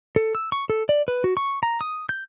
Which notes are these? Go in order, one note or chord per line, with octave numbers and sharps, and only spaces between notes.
A4
E6
C#6
A4
D5
B4
F#4
C#6
A#5
D#6
G6